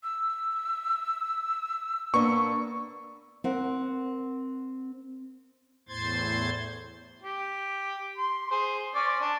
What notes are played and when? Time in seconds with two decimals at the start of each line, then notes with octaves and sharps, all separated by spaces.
0.03 E6
2.14 A#3 B3 D4 C#6
3.44 C4 A#4 F#5
5.89 E2 A2 C5 C6 G#6 A6
7.22 G4
8.18 C6
8.51 G#4 C5
8.95 C#4 C5 D5
9.21 D4